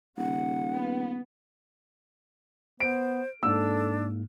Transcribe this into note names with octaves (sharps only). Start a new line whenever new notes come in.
D#1 C#3 F#5
B3
B3 C5 D7
G#2 A#3 D4 A4 E6